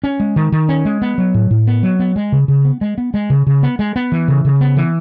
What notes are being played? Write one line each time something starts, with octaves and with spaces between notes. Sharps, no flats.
C#4
G#3
D#3
D#3
C#4
G#3
B3
F#3
A2
A2
B3
F#3
B3
G#3
C#3
C#3
B3
G#3
B3
G#3
C#3
C#3
B3
G#3
B3
E3
C#3
C#3
B3
E3